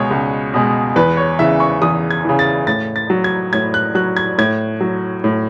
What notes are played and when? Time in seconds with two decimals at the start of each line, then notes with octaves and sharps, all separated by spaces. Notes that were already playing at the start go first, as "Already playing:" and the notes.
Already playing: C#2 B2 G#3 C#5
0.11 C#2
0.54 B2 G#3
0.96 E2 B4
1.17 C#5
1.39 C#3 E3 E5
1.60 C#6
1.82 E2 D#6
2.11 G#6
2.25 C#3 E3
2.39 A6
2.67 A2 A6
2.96 A6
3.10 F#3
3.24 G#6
3.53 A2 G#6
3.74 F#6
3.95 F#3 F#6
4.17 G#6
4.38 A2 G#6
4.80 F#3
5.24 A2